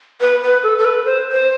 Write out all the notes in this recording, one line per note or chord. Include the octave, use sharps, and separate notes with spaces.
B4
B4
A4
A4
B4
C5
C5